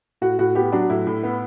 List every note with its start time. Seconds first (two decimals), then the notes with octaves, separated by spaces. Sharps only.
0.21 A2 F#4
0.39 A2 F#4
0.55 B3 G4
0.72 F#3 D4
0.90 A2 E4
1.07 A2
1.23 B3